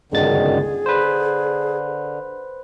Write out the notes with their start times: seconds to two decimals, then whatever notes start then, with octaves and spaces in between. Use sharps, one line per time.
0.12 G1 C#2 F#2 D3 D#3 G#4 A6
0.86 D3 B4 C5